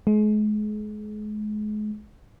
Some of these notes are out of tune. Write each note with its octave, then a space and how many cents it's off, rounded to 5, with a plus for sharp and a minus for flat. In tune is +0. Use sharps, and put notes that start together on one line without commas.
G#3 +35